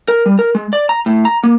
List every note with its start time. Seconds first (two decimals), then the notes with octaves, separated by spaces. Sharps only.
0.08 A#4
0.26 G3
0.39 A#4
0.55 G#3
0.73 D5
0.89 A#5
1.06 A2
1.25 A#5
1.43 A#3